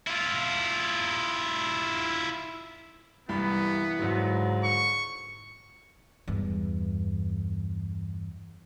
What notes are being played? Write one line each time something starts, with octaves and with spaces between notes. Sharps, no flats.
E4 F4
C2 G2 E3 B3 B5
C#2 G#2 D3 F#3
C#6
E2 G2